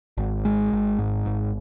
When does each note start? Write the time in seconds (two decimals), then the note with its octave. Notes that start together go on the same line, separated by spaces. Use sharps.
0.17 G#1
0.45 G#3
0.72 G#1
0.99 G#2
1.26 G#1